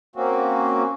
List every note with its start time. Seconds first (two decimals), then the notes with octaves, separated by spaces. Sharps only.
0.16 A#3 C4 C#4 F#4